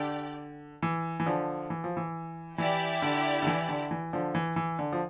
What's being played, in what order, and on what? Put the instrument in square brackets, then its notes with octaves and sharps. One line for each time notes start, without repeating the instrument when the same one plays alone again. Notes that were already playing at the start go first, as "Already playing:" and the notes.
Already playing: [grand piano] D3 [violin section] G4 D5 G5
[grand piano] E3
E3
D3 F3
E3
F3
E3
[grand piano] E3 [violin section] E4 G4 D5 G5
[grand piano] D3
D3
E3
D3
E3
D3 F3
E3
E3
D3
F3